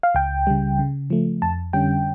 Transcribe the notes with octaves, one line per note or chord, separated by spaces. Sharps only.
F5
C#2 G5
C#3 G3
C#3
F3 A3
F2 A5
D3 G3 C#4 G5